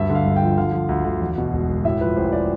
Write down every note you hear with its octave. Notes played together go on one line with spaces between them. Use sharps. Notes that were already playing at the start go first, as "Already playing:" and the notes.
Already playing: D2 G2 E5
D3
F5
G1
G5
F3
D3 F5
F3
D2
D2
E2
B2
E1
E1
A2 E5
F3 B4
A1 C5
D5